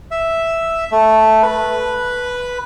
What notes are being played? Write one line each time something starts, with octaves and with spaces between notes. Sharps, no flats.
E5
A3
B4